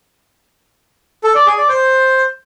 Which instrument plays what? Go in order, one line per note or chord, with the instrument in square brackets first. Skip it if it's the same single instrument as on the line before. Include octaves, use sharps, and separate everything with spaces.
[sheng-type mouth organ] A4
D5
G#4
D5
C5